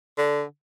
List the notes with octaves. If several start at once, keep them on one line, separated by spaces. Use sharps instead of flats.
D3